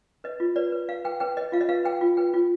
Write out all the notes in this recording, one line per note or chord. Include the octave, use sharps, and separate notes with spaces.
B4 D#5
F4
B4 D5
B4
B4 F5
B4 G5
B4 G5
B4 D#5
F4 F5
D#5
B4 F5
B4 G5
F4
B4 G5
F4